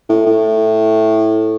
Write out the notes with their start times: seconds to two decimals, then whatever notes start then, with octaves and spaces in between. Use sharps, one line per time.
0.09 A2
0.26 A2